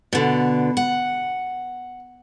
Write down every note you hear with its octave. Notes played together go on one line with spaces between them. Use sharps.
B2 D3
F#5